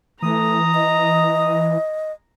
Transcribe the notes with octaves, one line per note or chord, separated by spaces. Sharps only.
E3 A3 A#5 D#6
D#5